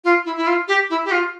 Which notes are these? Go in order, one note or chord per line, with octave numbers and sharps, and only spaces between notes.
F4
E4
E4
F4
G4
E4
G4
F4